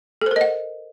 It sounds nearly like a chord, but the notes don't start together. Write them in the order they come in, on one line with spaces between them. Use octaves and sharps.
A4 C5 A#4 D#5 F#5